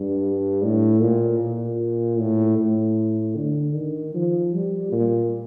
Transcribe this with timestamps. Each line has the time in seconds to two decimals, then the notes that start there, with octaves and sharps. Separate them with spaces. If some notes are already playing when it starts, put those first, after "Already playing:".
Already playing: G2
0.63 A2
1.02 A#2
1.40 A#2
2.19 A2
2.58 A2
3.35 D3
3.75 D#3
4.14 F3
4.53 G3
4.92 A#2